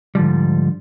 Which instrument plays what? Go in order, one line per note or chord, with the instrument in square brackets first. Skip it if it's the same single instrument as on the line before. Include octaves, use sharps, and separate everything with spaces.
[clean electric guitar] G#2 D3 F3 G3